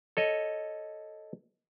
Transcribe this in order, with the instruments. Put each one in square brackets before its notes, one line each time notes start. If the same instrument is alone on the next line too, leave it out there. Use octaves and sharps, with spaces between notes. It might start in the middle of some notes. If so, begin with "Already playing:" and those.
[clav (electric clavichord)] A4 C#5 D#5